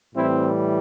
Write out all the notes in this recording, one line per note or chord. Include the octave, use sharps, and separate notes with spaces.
A2 E3 G3 C4 E4